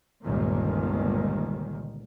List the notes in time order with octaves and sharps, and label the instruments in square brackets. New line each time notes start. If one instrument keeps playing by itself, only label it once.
[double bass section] G1 C#2 A#2 D#3